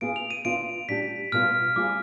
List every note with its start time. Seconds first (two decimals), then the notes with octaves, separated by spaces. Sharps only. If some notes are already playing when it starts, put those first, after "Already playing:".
0.01 B3 F4 G#4 D7
0.16 F7
0.31 D#7
0.45 B3 D4 F4 D7
0.89 G3 D4 G4 B6
1.32 B2 G3 B3 F4 F6
1.76 G3 C4 F4 G#4 D6